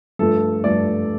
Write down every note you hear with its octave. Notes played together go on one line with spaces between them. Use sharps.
G2 F3 A3 A4
G2 F3 A3 D5